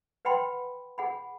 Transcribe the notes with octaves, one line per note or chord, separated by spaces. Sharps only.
B4 F#5 G5 B5 C6
G#4 F#5 B5